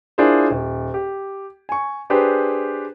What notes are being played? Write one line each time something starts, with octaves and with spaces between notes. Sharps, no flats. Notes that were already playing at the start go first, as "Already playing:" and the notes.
D4 E4 F4 G#4 A#4 C5
D#1
G4
G#5 C#6
D4 G4 G#4 B4 C5